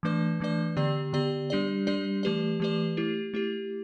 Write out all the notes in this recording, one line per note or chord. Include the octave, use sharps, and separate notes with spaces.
E3 A3 D4 B4 D5
E3 A3 D4 B4 D5
D3 B3 G4 D5
D3 B3 G4 D5
G3 D4 G4 D5
G3 D4 G4 D5
E3 A3 G4 B4 D5
E3 A3 G4 B4 D5
A3 E4 G4
A3 E4 G4